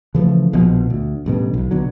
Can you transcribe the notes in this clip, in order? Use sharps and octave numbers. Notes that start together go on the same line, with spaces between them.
C#3 E3 F3 A3
A#1 B2 F3
D2
A1 G2 B2
B1
B2 D3 F#3